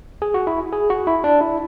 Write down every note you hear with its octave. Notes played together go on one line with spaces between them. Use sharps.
G#4
F#4
E4
G#4
F#4
E4
D4
E4